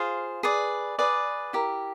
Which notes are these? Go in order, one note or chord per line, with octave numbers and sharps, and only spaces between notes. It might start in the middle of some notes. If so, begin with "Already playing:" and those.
Already playing: F4 G#4 C5 F5
G#4 B4 D5
G#4 B4 D5
E4 G4 A#4